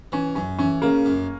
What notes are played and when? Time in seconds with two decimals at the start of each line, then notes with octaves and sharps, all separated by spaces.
0.12 E3 C#4
0.35 F#2 C#4
0.59 E3 C#4
0.82 C#3 A#3
1.05 F#2